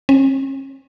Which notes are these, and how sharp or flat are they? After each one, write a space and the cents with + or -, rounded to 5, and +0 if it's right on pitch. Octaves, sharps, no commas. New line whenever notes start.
C#4 -45